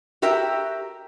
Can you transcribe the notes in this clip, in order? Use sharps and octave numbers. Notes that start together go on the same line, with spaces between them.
F#4 G4 A#4 E5 G5